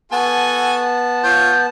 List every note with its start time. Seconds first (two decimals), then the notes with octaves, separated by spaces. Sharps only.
0.12 B3 F#4 A4 G#5 A5
1.24 F4 C#5 G6